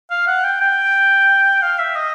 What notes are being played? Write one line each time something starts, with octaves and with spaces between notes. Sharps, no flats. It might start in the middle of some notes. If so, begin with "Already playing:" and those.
F5
F#5
G5
G5
F5
E5
D#5